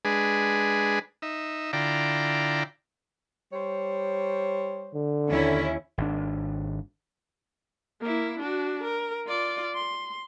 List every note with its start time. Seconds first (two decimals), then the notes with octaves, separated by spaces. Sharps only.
0.05 G#3 D4 G#4 B4
1.22 D#4 E5
1.73 D3 E4 F4 D5 G5 A#5
3.53 G3 C5 C#5
4.94 D3
5.30 D#2 C#4 E4
5.98 G#1 D4
8.01 A#3 E4
8.39 D4 F#4
8.83 A#4
9.27 F4 D5
9.74 C6